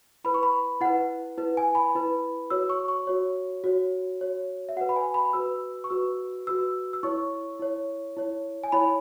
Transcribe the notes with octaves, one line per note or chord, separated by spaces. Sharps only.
E4 B4 B5
C#6
B5
E4 B4 F#5
E4 B4
G#5
B5
E4 B4
F#4 C#5 E6
C#6
C#6
F#4 C#5
F#4 C#5
F#4 C#5
E5
F#4 B4 F#5
B5
G#5
B5
F#4 B4 E6
C#6
F#4 B4 E6
F#4 B4 E6
E6
E4 C#5 C#6
E4 C#5
E4 C#5
G#5
E4 C#5 B5